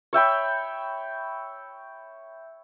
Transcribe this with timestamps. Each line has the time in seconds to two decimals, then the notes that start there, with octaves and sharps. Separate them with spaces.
0.13 C#5 E5 G5 B5